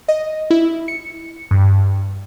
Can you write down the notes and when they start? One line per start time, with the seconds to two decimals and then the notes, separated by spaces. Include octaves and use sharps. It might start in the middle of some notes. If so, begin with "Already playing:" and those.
0.08 D#5
0.50 E4
0.88 C#7
1.51 G2